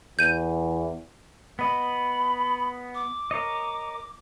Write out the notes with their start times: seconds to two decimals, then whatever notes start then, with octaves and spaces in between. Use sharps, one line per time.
0.19 E2 G6 D#7
1.59 B3 D#5 B5
2.95 D6
3.31 A#4 C#5 D#5